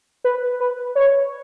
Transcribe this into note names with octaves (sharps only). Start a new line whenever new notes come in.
B4
B4
C#5